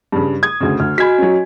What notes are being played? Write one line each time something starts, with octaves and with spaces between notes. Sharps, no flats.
G2 C#3
D#6 G#6
D2 C#3
D2 F6
F#4 D#5 G#5 B5 G#6 B6
F#3 C#4